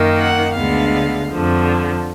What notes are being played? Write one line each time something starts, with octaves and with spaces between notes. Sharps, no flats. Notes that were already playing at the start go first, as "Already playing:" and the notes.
Already playing: F#2 D#3 A#3
F#5
D2 D3 G#3 B3 F5
F2 D3 F3